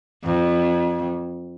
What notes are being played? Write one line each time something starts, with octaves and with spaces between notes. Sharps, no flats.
F2